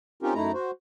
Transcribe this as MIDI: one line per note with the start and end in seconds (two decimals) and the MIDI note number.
0.23 0.34 60
0.23 0.34 61
0.23 0.34 63
0.23 0.34 65
0.23 0.34 67
0.23 0.34 70
0.35 0.52 42
0.35 0.52 57
0.35 0.52 63
0.35 0.52 64
0.35 0.52 82
0.53 0.71 66
0.53 0.71 72